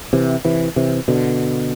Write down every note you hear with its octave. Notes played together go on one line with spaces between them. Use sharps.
C3 E3
C3 E3
C3 E3
B2 D3